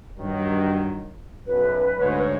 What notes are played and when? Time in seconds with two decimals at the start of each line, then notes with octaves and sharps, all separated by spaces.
0.19 G2 D#3 F#3
1.47 B1 F#2 B4
1.97 D2 G#2 C#5